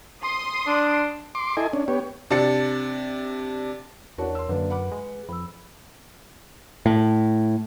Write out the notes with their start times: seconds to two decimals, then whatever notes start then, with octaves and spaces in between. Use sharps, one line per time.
0.23 C6 D#6
0.67 D4
1.35 C6 D6
1.57 E4 A4 D#5 G#5
1.73 C#4 D4
1.88 B3 G4 C#5
2.31 C3 D4 A6 C#7
4.18 E2 D4 F#4 A#4 C#5 A5
4.35 C6 E6
4.49 F#2 D3 A#3 D4 B4
4.70 F#5 B5 D6
4.92 G#3
5.28 F2 B5 E6
6.86 A2